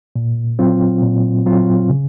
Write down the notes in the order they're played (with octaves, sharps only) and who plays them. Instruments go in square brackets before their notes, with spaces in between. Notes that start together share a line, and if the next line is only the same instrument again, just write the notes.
[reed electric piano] A#2
F#3 C4 F4
A#2
F#3 C4 F4
C#3